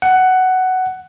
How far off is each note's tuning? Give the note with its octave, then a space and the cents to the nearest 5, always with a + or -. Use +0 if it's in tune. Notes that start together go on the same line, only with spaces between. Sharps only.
F#5 +10